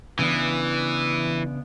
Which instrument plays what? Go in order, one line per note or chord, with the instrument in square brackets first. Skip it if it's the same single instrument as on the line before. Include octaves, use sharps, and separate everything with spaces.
[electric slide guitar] C#3 B3 D4 [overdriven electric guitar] E3